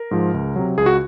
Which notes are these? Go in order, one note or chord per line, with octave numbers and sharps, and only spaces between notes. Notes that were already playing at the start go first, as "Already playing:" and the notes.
Already playing: A#4
G#2 F3
C#2
C3 F#3
C#2 G#4
F#4